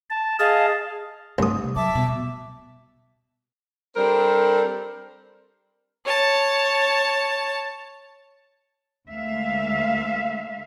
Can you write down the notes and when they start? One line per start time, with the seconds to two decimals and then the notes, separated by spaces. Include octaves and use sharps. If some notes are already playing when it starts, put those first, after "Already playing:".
0.10 A5
0.39 G#4 D#5 F5 A5
1.38 C2 G2 A3 D#6
1.64 C3
1.76 F#3 E5 A5 D6
1.95 B2 G3
3.96 G3 C4 D4 A4 A#4 C5
6.05 C#5 A5
9.09 D2 G#3 A#3 E5 F5